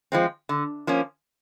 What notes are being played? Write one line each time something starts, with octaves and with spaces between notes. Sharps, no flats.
F3 G#3 C4
D3
F3 A#3 C#4